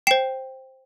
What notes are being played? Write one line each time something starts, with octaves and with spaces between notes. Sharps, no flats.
C5 G5 C7 E7